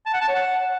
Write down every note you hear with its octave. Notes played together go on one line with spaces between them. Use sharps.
A5
F#5
A5
C#5
F#5